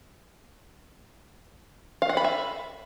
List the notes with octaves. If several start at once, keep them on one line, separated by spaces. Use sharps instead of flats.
F5
F#5
B5
E5